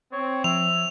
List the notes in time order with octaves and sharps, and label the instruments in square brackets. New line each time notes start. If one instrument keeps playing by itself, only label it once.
[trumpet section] C4 [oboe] C#5
[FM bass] F3 [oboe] E5 [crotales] F7